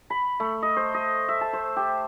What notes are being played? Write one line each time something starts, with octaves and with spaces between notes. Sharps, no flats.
B5
A3
D#5
C5
D#5
E5
A5
C5
G4